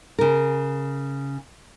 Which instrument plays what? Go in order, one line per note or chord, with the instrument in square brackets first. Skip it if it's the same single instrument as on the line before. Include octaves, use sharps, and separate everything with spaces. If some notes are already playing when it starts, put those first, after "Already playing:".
[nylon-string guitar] C#3 A#4